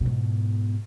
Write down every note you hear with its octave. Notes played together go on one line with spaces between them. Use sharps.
G#2 B2